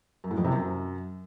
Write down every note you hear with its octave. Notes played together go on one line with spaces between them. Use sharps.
F#2
A2
F2
C3
F#2